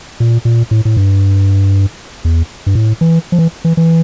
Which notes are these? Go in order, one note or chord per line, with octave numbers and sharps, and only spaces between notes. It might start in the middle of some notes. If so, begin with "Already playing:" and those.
A#2
A#2
A2
A2
G2
E2
G2
A2
E3
F3
E3
E3
E3